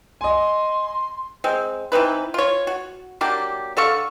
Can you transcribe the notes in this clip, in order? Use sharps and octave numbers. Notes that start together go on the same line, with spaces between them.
D#5 G#5 C6
G#3 C4
E3 C4 D#4 B4
F4 C#5
F#4
F#3 A#3 D4 G4
D3 A4 F5 C#6